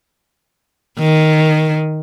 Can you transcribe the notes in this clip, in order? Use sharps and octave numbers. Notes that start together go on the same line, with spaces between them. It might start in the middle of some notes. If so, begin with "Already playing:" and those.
D#3